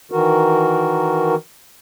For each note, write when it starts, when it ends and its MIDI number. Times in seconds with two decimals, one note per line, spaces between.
0.11 1.35 51
0.11 1.35 52
0.11 1.35 66
0.11 1.35 70